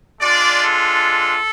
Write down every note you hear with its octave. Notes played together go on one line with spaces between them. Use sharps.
G#3 D4 F4 D5
A4